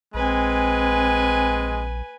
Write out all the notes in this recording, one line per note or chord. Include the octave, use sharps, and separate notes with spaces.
A#1 G#3 C4 B4 G#5